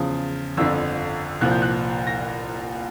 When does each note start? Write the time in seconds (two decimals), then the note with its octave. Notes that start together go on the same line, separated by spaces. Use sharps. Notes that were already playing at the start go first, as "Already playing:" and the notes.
Already playing: E2 C#3 F3
0.57 G1 F2 D3 E6
1.41 C2 A#2 F3 F#6
1.51 G6
1.62 F#6
2.07 A#6